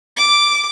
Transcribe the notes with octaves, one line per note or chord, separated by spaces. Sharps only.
D6